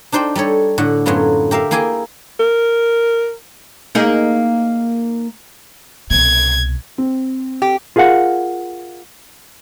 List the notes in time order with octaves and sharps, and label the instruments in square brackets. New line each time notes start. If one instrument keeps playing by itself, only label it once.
[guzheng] D4 D#4 C5 D5 G5
G3 D#4 A4 C#5
A2 D3 F#5
F#2 A2 F#3 B3 F4
G4 A#4 E5 F5
A#3 E4 G#4 G5 G#5
[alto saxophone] A#4
[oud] A#3 D#4 G#4
[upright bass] C2 B2 [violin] G#6
[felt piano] C4
[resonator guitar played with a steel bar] G4
[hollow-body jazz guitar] F4 G#4 A#4 F5 F#5